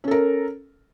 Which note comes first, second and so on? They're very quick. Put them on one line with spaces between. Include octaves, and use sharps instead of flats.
C#4 A4 A#4